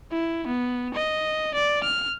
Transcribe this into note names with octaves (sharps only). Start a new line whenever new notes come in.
E4
B3
D#5
D5
F6